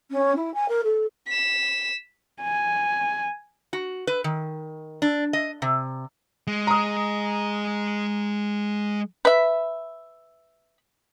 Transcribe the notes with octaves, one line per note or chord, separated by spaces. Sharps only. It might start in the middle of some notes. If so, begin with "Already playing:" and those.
C#4
E4
G#5
A#4
A4
B6 E7
G#5
F#4
B4
D#3
D4
D#5
C3
G#3
A#5 D#6
B4 E5